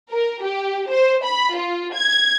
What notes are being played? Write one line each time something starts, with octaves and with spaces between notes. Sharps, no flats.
A#4
G4
C5
B5
F4
G#6